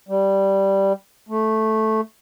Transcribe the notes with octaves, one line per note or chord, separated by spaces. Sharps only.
G3
A3